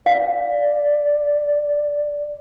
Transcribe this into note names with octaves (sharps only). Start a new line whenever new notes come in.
D5 F5